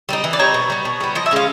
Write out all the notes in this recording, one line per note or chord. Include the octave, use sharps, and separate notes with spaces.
G3 C4 D#4
E3
D5
G3 C4 D#4 C#5
B2
G3 B3
B2
G3 B3
F3 D#5
E5
G#3 C#4 F5